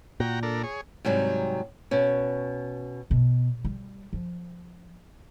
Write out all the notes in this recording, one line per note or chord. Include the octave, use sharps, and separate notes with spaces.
A#2 F#4 G5 A#5
D4 A4 A#4
G#4 C#5
G#2 C3 F#3 G3
B2 C#4
B2
G3
F3